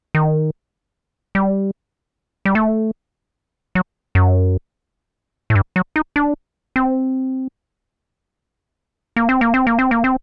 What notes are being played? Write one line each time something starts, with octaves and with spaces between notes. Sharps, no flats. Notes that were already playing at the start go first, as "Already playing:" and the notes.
D#3
G3
G3
A3
F#3
F#2
A2
G2
F#3
D#4
D4
C4
A#3
C4
A#3
C4
A#3
C4
A#3
C4